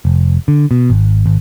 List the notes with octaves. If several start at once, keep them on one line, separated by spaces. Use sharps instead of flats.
F1
D3
B2
G#1
G#1